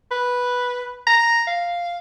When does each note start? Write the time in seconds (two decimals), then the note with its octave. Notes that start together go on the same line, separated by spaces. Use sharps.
0.11 B4
1.07 A#5
1.47 F5